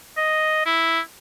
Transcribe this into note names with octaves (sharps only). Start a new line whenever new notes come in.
D#5
E4